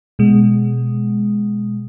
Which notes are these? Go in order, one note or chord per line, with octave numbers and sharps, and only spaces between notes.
B2 G#3